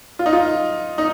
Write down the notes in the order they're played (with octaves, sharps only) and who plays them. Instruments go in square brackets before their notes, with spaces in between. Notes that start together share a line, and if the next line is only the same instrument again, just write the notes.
[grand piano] F4
D#4
F4
D#4